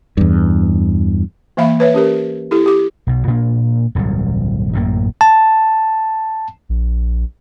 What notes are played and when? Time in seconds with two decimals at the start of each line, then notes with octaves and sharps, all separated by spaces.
0.17 E2 G2
1.57 E3 A#3 E5 F5 B5
1.80 B4 C#5 E5
1.94 C#4 G4 A#4
2.51 E4 G4 A4
2.66 G4 D6
3.07 B1 B2
3.27 A#2 A#3 D4
3.95 D#1 C2 G#2 F#3
4.73 A1 F#2 A2 A#3
5.21 A5
6.69 A#1